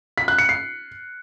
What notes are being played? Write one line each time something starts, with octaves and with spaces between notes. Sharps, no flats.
B6
F#6
C#7
C7